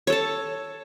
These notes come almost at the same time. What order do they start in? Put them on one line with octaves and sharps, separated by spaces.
C#5 A4 A5